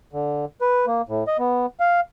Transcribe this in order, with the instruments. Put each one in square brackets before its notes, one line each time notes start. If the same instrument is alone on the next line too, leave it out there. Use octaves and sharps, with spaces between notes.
[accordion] D3
B4
A#3
A2
D#5
B3
F5